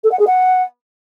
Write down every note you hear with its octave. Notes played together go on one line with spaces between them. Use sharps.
A4
F#5
G#4
F#5